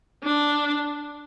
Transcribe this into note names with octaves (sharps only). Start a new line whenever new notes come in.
D4